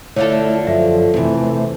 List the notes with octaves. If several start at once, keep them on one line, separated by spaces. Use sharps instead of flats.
D3 A3 E4 F4 A4 C#5
F#2 F3 E5
E2 C3 E3 A3 C4